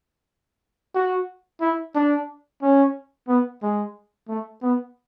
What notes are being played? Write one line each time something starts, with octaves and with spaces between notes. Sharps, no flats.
F#4
E4
D4
C#4
B3
G#3
A3
B3